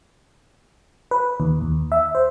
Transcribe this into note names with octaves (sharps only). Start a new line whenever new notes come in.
B4
D#2
D#2
E5
C5